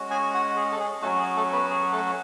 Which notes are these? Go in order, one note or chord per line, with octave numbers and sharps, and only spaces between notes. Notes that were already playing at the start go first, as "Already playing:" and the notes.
Already playing: G#3 C#4 F#4
G#4 G#5
F#4 F#5
G#4
A4
G#4
F#3 A3 C#4 F#4 A4
G#4
A3 A4
B3 B4
G#4
A3 A4